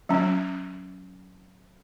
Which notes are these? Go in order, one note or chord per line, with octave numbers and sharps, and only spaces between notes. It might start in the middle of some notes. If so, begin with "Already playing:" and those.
F#3 C#4